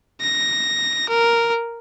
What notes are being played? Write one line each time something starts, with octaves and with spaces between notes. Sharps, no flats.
A#6
A#4